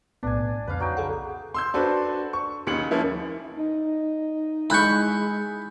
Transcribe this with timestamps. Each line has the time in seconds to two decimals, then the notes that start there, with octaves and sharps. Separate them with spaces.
0.23 B1 A2 B3 D4 G#5
0.67 F2 C#3 B4 D5 F5
0.80 F#3 D#4 G5
0.97 G#4 A4 F#5
1.54 C6 E6 G6
1.74 D4 F#4 A4 B4 C5
2.33 C#6
2.67 D#2 C#3 C#7 F#7
2.91 F3 A#3 C#4 E4
3.56 D#4
4.70 G#3 E4 B5 C#6 F#6 G6